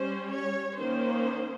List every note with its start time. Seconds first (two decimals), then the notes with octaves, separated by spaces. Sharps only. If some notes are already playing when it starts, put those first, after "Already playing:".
Already playing: G3 C#4 C5
0.31 C#5
0.78 D#3 A#3 C#4 C5